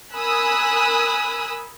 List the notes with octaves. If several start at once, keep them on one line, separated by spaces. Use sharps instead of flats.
A#4 G#5 B5 D#6 E6 F#6